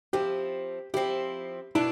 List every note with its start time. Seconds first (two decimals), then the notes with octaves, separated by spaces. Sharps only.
0.13 F3 C4 E4 G4
0.94 F3 C4 E4 G4
1.75 B2 B3 D4 E4